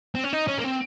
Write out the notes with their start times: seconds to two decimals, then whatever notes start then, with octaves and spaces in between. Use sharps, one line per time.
0.15 C4
0.24 C#4
0.33 D#4
0.48 C#4
0.59 A#3
0.64 C4